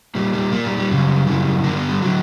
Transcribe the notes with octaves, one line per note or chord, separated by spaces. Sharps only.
A#2 G3
G3
A#2 A#3
G3
G3
F#2 C#3
F#2 C#3 E3
G2 D3 A#3
B3
G3
D3 F#3